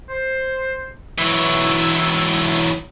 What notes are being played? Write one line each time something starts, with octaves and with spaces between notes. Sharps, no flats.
C5
E3 F#3 E4